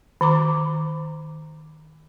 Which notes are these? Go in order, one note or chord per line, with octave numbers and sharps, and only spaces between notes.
D#3 A#5 D6